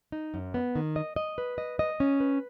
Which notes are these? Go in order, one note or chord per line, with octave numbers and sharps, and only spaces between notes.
D#4
F#2
B3
D#3
D#5
D#5
B4
D#5
D#5
C#4
B4